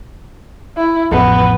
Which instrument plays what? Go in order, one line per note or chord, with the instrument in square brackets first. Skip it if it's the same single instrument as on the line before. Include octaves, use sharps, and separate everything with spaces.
[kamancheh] E4
[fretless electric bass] A1 F2 [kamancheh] B3